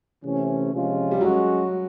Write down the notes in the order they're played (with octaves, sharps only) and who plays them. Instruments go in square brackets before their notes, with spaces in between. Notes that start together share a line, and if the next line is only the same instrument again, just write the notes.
[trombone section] C3 E3 A3 C#4
C3 F3 G#3 C#4 F4
[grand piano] G3
[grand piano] F#3 [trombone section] G#3 C#4 F#4